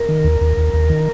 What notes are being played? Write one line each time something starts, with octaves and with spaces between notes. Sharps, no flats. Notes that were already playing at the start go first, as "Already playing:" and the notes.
Already playing: A#4
D#3
D#2
D#2
D#2
D#2
D#3